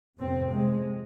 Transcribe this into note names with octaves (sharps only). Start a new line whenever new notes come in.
F2 C3 C4
G#3